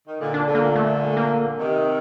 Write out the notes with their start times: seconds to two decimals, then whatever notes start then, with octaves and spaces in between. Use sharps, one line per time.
0.08 D#3
0.20 A#2 D3
0.34 D4
0.47 A#2 D3
0.55 A#3
0.76 A3
1.17 A#3
1.59 C3 D#3